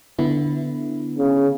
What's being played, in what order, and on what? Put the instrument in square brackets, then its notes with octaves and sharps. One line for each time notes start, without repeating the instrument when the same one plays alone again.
[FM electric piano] D3 B3 E4
[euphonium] C#3